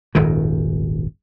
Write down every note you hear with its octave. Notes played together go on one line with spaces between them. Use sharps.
D#1 G#1 F#2 D#3